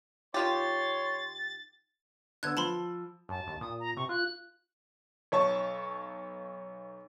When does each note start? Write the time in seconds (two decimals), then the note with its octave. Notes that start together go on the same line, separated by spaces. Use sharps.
0.34 D#3 F4 G4 C#5 C6 A6
2.43 D3 B3 E6 F#6 G#6
2.57 F3 A5 B5 C6
3.29 F#2 A5
3.47 D#2
3.61 A#2 D#6
3.80 A#5
3.97 C3 C#6
4.09 F4 F#6
5.32 B1 C#5 A5 C#6